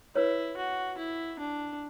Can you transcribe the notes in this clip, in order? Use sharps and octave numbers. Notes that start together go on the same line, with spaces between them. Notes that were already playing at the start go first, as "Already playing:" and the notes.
E4 B4 C#5
F#4
E4
D4